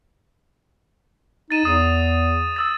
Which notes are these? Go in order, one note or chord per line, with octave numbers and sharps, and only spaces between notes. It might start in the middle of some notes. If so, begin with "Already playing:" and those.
D#4 A6 D#7 E7
E2 D#6 D#7
D#6 E6 A6